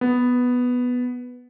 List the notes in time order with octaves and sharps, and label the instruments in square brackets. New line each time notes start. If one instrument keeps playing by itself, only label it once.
[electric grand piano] B3